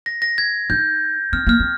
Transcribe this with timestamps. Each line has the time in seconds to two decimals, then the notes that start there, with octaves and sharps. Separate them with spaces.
0.06 A#6
0.22 A#6
0.38 G#6
0.70 D#4 G6
1.33 C4 F6
1.47 A#3 F6
1.60 C4